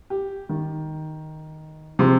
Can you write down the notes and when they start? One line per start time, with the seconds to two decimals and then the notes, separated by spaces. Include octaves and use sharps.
0.10 G4
0.49 D#3
1.99 C3 F3 G#3 C6